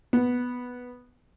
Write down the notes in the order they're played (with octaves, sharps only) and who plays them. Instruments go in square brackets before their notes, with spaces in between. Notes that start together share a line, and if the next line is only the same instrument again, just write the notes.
[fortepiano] B3